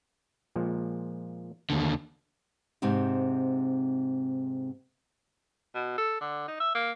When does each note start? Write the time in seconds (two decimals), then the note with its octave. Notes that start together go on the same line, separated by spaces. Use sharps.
0.56 A#2 F3 G#3
1.70 D#2 D3
2.82 G#2 C3 C4 D#4
5.75 B2
5.98 A4
6.21 D3
6.48 D#4
6.60 E5
6.75 A#3